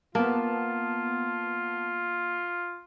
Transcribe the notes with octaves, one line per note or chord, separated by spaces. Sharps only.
A#3 B3 F4 A5